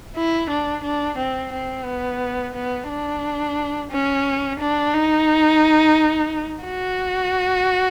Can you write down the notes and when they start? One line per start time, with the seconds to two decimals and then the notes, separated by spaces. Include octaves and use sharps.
0.16 E4
0.50 D4
0.83 D4
1.18 C4
1.52 C4
1.85 B3
2.55 B3
2.89 D4
3.91 C#4
4.60 D4
4.93 D#4
6.65 F#4